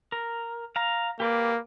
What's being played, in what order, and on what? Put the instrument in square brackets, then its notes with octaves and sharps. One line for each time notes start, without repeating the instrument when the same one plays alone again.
[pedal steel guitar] A#4
F5 A#5
[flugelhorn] A#3 [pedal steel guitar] G4 B4 D5